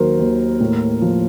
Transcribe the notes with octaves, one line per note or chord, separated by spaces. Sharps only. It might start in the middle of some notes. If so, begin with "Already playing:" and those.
Already playing: D#2 D#3 F#3 A#4 C5
D#2
A2
F3